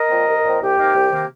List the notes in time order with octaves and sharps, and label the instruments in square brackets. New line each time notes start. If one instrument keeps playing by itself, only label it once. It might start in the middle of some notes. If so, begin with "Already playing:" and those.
Already playing: [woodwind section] A#4 D#5
A#2 F3 C4
C2
A#2 F3 C4
C2 G4
C3 D#3 A#3
C2
C3 D#3 A#3